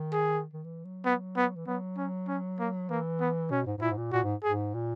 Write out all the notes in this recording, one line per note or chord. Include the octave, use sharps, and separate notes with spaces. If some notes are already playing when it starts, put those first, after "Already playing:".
Already playing: D#3
G#4
D#3
E3
F#3
B3
B3
E3
F#3 B3
C#4
C#4
A#3
E3 A#3
B3
B2 C#4
G#2
G#2
A#2 E4
G#2
A#2
A#2 F#4
G#2
G#2 G#4
A#2